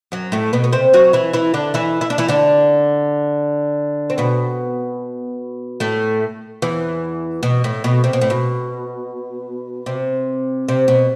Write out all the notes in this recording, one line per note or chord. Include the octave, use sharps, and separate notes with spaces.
F#2 F#3
A2 A3
B2 B3
B3
C3 C4
F#3 F#4
E3 E4
E3 E4
D3 D4
E3 E4
E4
D4
E3 E4
D3 D4
C4
B2 B3
A2 A3
E2 E3
B2
A2
B2
C3
B2
A2
B2
C3
C3
B2